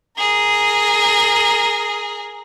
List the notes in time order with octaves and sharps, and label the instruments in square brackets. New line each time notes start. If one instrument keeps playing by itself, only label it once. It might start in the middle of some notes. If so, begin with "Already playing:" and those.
[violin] G#4 A#4